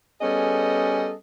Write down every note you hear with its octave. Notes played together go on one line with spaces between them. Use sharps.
G3 B3 C#4 G#4 A4 D#5